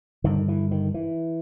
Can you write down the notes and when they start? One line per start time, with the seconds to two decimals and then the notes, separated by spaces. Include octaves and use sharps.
0.24 G2 D3 D#3
0.48 E3
0.71 D#3
0.94 E3